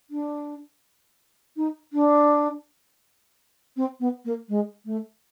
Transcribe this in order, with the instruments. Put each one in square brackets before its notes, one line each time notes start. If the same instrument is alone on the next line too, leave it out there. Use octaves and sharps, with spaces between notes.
[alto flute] D4
D#4
D4
C4
B3
A#3
G#3
A3